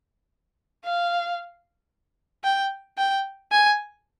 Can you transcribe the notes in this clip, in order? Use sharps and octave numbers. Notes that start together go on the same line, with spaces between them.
F5
G5
G5
G#5